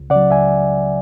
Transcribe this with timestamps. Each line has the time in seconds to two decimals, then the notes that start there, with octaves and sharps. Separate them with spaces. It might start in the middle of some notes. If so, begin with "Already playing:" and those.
Already playing: C#2
0.10 C#3 D5 F#5
0.15 F#3
0.30 C#2 E5 G#5